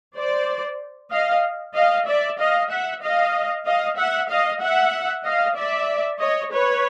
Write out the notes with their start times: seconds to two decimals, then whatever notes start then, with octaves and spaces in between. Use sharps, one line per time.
0.16 C5 D5
1.12 D#5 F5
1.75 D#5 F5
2.07 D5 E5
2.39 D#5 F5
2.70 E5 F#5
3.02 D#5 F5
3.66 D#5 F5
3.97 E5 F#5
4.29 D#5 F5
4.61 E5 F#5
5.24 D#5 F5
5.56 D5 E5
6.20 C#5 D#5
6.52 B4 C#5